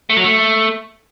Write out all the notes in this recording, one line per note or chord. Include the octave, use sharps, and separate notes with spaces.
A3
F#3
A3